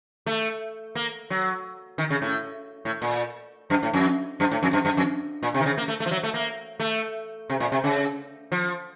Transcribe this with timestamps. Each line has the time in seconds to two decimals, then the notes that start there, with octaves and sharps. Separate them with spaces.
0.26 A3
0.95 A#3
1.30 F#3
1.98 D#3
2.10 C#3
2.22 A2
2.85 A2
3.02 A#2
3.70 F#2
3.83 A2
3.93 F2
4.40 F#2
4.51 A2
4.63 F2
4.73 F#2
4.85 F#2
4.97 F2
5.43 A#2
5.54 C3
5.61 D#3
5.66 C#3
5.78 A#3
5.88 A3
6.00 A3
6.06 F3
6.11 F#3
6.23 A3
6.34 A#3
6.80 A3
7.50 C3
7.60 A#2
7.72 C3
7.84 C#3
8.52 F3